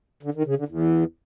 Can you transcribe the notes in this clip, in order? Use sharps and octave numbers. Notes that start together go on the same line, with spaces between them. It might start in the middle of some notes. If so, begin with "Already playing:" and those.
D3
D#3
C#3
D3
E2